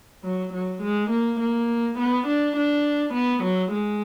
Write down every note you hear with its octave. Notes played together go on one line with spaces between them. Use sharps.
F#3
F#3
G#3
A#3
A#3
B3
D4
D4
B3
F#3
G#3